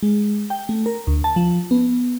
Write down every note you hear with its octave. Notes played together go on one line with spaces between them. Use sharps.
G#3
G5
A3
A#4
D2
A5
F3
B3